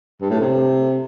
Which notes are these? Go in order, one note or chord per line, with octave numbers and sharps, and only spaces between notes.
G2
A2
C3